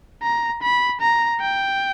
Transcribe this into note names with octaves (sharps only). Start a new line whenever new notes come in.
A#5
B5
A#5
G5